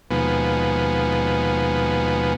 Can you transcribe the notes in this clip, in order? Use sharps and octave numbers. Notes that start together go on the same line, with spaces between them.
D#2 B2 F3 G#3 B3